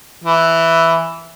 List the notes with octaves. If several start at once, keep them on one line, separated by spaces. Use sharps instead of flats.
E3